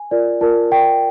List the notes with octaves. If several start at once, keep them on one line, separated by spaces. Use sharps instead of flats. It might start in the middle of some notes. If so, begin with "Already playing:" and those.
Already playing: G#5
F4 A#4 D5
F4 A#4 D5 A5
F4 A#4 D5 G5